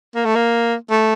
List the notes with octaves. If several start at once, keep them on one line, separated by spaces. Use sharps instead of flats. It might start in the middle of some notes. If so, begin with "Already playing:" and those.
A#3
A3
A#3
A3